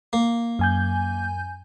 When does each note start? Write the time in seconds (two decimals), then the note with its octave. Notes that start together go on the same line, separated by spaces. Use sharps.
0.13 A#3
0.59 F#2 G#5 G6